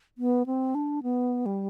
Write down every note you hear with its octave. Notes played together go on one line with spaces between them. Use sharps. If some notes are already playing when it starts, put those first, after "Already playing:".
B3
C4
D4
B3
G3